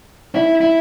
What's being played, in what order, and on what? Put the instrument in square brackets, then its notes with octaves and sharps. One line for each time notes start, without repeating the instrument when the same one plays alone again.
[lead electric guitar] E4
E4